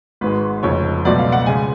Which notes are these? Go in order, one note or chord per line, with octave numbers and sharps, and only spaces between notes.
G#1 G#2 G#3 B4
F1 F2 C#3 C#5
C#2 B2 F#3 A3 D5
F5
F#5
C#3 G#3 G#5